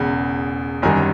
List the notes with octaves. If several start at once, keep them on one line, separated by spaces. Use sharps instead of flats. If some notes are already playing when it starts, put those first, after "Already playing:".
Already playing: E1 E2 C#3
G1 F#2 D#3 G3 G#5 A#5